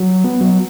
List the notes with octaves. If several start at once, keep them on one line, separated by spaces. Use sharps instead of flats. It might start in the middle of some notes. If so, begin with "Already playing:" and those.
Already playing: F#3
B3
F#3